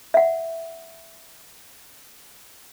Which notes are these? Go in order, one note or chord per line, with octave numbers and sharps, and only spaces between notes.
E5 F#5